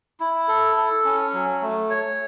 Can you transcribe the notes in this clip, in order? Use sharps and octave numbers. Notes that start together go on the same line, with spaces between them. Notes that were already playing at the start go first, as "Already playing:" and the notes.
E4
A4
A4
C#4
F#3
A3
C#5